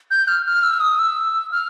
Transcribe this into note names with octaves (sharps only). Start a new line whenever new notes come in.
G6
F6
F6
E6
D#6
E6
F6